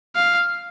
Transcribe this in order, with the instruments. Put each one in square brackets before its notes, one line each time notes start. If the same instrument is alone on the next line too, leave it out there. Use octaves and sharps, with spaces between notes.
[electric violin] F5